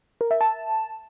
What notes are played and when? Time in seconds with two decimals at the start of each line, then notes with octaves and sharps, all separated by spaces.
0.21 A#4
0.31 E5
0.41 A5